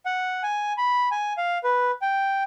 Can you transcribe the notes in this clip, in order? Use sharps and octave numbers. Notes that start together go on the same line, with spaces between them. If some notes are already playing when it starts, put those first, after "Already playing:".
F#5
G#5
B5
G#5
F5
B4
G5